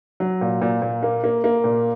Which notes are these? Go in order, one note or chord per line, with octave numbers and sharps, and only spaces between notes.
F#3
A#2
A#2
A#2
A#3
A#3
A#3
A#2